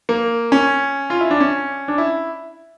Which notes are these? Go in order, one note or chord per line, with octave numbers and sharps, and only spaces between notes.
A#3
C#4
F4
E4
D4
C#4
D4
E4